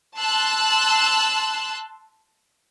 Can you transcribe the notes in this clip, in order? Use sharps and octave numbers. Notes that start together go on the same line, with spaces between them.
A5 C6 E6 F#6